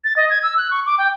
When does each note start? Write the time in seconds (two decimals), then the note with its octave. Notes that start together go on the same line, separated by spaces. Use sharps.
0.04 A6
0.16 D#5
0.30 G#6
0.43 E6
0.57 F#6
0.71 C#6
0.86 D6
0.98 G5